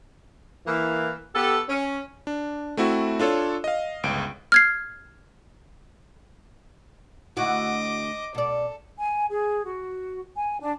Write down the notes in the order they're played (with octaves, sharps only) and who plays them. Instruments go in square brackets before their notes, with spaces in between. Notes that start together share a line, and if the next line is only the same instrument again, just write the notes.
[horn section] E3 A#3
B3 G4 A4
C#4
[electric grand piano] D4
A3 C4 E4 F#4
D4 F4 A4 C#5
D#5 F5
G1 C#2 D7
[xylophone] F6 G#6 C7
[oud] D2 E4 F#4 [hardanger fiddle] D#5 D6
[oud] B2 D5 [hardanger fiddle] A4
[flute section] G#5
G#4
F#4
G#5
D4